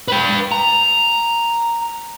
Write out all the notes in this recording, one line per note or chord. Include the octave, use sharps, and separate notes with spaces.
B4 G5
A#5